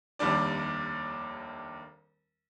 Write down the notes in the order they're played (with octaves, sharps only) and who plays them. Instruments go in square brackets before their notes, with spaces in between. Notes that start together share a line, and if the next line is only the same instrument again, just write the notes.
[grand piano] F1 D#2 G3 D4 D5